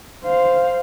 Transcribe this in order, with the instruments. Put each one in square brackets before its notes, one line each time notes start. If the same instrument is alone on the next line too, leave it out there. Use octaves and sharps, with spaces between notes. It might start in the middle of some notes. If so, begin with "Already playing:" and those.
[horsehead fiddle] C5 F5